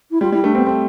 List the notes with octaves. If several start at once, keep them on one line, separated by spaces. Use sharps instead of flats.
E4
G3 F4
G3 E4
A3 D4
B3 C4
A3 C4